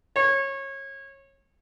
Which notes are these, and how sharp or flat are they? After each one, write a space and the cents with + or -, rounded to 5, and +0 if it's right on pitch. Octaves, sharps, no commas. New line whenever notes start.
C#5 -25